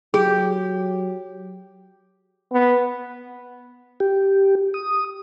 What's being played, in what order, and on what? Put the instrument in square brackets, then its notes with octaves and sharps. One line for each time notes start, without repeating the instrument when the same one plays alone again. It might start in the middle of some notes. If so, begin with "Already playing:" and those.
[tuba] F#3 [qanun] G4 [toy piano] G#4
[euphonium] B3
[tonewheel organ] G4
D#6